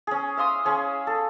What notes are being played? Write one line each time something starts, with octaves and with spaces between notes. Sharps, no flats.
C#4 G#4
E5 F5 C6 D#6
C#4 G#4 C#5
A4